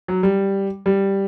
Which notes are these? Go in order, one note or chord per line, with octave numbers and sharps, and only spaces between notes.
F#3
G3
G3